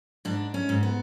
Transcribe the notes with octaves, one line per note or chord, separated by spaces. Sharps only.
G#2 D4
C#4
G#2
B3